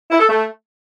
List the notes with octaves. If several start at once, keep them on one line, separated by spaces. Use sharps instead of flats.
E4
A4
A3